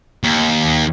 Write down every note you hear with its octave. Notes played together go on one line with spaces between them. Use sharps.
D#2